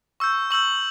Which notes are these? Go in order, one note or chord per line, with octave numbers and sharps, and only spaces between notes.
C#6 E6 G6
C#6 E6 G6 F#7